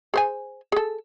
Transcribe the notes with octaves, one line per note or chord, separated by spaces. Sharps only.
G#4 C5 G#5
G#4 A4